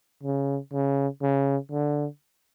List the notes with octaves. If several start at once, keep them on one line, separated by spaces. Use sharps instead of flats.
C#3
C#3
C#3
D3